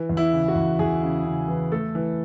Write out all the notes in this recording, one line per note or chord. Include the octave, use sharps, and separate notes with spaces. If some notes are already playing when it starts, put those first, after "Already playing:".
Already playing: E3
E2
E4
C#3
F#4
E2
E2 G#4
C#3
C#3
E3
A3 A4
E3